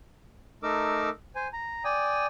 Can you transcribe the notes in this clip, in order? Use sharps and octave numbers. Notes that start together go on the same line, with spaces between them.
A3 D#4 A#4 D6 E6
C5 G#5
A#5
D5 G5 G#5 D#6